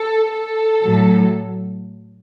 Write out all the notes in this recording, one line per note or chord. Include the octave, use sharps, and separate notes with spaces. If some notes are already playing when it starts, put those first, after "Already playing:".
Already playing: A4
A4
A2 F#3